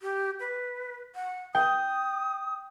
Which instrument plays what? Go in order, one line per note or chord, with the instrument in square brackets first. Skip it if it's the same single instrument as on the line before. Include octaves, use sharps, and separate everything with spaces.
[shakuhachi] G4
B4
F#5
[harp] G5 [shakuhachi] D#6